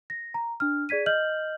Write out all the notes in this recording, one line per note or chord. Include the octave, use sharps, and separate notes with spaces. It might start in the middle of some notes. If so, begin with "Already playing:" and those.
A#6
A#5
D4 F6
G#4 D5 G#6 B6 D#7
D#5 F6 G6 F#7